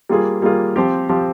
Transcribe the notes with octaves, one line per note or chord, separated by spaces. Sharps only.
G3 A#3 F4 G#4
G3 A#3 F4 G#4
F3 C4 G4
F3 C4 G4